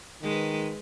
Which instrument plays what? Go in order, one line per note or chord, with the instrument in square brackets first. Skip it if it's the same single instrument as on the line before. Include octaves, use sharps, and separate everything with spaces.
[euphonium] D#3 [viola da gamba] G#3 B4